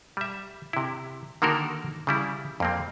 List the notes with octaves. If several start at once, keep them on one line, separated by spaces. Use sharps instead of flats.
G3 E5
C3 E4
D3 D#3 A#3 F#4 A4 A#4
C#3 G3 E4
F2 A#3 C4